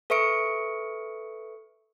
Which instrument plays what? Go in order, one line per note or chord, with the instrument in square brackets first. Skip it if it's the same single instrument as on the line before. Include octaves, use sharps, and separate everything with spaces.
[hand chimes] A4 B4 E5 C#6 C#7 D7